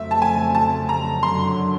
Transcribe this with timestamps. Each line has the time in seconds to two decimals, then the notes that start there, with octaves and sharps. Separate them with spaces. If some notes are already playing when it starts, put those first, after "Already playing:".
Already playing: F2 C#3 F#3 A3 C4 E5
0.11 A5
0.22 G#5
0.55 A5
0.89 A#5
1.23 F#2 D3 F#3 C6